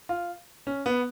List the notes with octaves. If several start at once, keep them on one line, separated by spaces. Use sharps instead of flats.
F4
C#4
B3